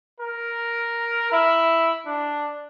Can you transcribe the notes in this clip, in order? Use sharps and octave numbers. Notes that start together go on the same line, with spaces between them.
A#4
E4
D4